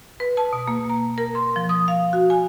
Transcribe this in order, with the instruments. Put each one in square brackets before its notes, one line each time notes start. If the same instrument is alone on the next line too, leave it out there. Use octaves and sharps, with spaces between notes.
[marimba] B4
A5
B2
A#3
A#5
A#4
C6
F3
D#6
F5
F#4
G#5